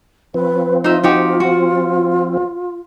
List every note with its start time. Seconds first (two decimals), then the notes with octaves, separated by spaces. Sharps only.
0.34 F3 C4 B4
0.84 D#4 F4 E5
1.03 D#4 F#4 G4
1.40 F#4